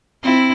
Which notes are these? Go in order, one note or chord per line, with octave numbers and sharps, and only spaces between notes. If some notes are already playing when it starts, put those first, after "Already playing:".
C4 E4